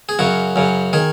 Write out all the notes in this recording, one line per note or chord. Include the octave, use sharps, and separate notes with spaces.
G#4
F#2 C#3 F#4
F#2 C#3
D#3 G#4